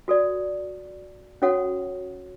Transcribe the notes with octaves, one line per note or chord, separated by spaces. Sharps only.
F#4 A4 D5
C#4 F#4 A4 C#5 F#5